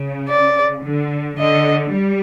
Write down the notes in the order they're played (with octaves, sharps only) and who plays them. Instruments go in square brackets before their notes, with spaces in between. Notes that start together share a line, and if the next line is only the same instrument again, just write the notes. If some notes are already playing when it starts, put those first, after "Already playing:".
Already playing: [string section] C#3
[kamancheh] D5
[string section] D3
[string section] D3 [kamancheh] D#5
[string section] G3